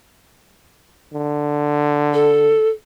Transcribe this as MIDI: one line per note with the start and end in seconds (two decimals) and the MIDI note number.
1.13 2.55 50
2.13 2.69 69